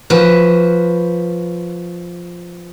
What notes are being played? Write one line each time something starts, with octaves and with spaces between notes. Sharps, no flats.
F3 F#4 B4